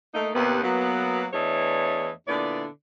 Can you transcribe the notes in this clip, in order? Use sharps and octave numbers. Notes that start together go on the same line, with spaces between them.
A3 A#3 D#4
D#2 C3 B3
F#3 A#3 B3
E2 E3 A3 D4 C#5 D#5
A#2 D3 B3 E4 D5